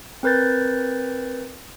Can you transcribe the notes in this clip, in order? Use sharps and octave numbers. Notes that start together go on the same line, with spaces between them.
C4 A#4 B4 G6 A6